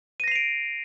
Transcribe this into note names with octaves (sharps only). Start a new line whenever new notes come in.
A#6 C7 D7 D#7 F7